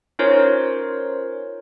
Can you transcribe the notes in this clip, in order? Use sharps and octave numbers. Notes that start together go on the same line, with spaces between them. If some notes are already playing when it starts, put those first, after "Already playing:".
C#4 D#4 F4 A#4 C5 C#5